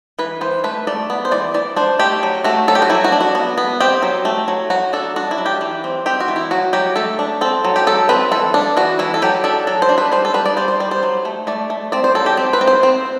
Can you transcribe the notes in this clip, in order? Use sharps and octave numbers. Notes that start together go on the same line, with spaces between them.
E3 B4
E3 C5
A3 B4
A3 D5
B3
C5
E3 D5
E3 D5
D4 C5
A3 G4
F#3
A3 F#4
F#3 A4
G4
F#4
F#3 E4
F#4
D4
F#4
B3
B3
C4 G4
F#3
A3
F#3
F#3 F#4
D4 A4
D4 F#4
E4
F#3
G4
E3
C4
C4 G4
F#4
E3
E4
F#3 F#4
F#3 G4
A3 A4
D4
C4 A4
F#3
G4
F#3 A4
C4 B4
E3 A4
D4
E3 F#4
E3 E4
A4
F#3 G4
D4 A4
F#3 A4
C5
D4
B4
G3 C5
A4
G3 B4
D5
G3 C5
C5
G3 D5
C5
F#3
A3
A3 D5
A3
C4 D5
C5
F#3 A4
G4
C4
B4
C4
C5
C4